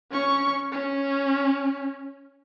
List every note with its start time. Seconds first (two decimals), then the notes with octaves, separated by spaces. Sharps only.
0.11 C#4 C#6
0.72 C#4